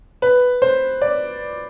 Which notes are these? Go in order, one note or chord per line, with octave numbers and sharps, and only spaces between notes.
B4
C5
D5